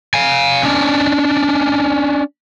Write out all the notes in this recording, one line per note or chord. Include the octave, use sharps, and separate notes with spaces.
F5 G#5
C#4 D4